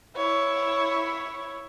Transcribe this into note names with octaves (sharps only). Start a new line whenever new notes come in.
E4 C#5